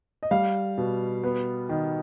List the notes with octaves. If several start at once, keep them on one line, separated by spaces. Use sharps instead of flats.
D#5
G3 F5
B2
B3
D#3